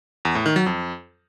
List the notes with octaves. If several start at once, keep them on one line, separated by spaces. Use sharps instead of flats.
E2
A2
D#3
F#3
F2